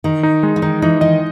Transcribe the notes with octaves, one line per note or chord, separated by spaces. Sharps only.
D#3 D#4
D#4
G#3
E3
D#3 D#4
E3 D#4
D#3 D#5